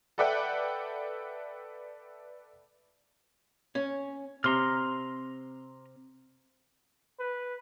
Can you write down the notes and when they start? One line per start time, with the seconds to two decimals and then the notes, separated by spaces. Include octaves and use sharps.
0.18 A4 B4 D5 E5 F#5 G5
3.75 C#4
4.44 C3 A#5 C6 F6
7.19 B4